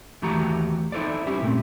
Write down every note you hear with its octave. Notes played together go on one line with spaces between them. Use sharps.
D#2 E3 A3 F#4 G4 A#5
D#4 E4 F#4 A4 C5 D5
G3 C#4 E4 G4
A#2 A3 C4